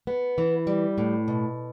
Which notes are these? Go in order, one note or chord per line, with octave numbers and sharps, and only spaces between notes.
B3
E3
G3
A2
B2